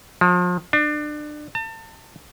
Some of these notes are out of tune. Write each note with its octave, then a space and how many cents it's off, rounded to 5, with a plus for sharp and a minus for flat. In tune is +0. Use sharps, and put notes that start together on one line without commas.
F3 +35
D4 +30
A5 +35